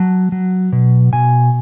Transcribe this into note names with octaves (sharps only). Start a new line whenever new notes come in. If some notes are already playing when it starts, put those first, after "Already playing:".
Already playing: F#3 A5
F#3
B2
B2 G#5